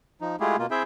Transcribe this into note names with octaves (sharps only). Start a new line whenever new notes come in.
F3 D#4
G#3 A3 E4 F4 G4 G#4
B2 A#3 F4
C4 E4 G#4 E5 G5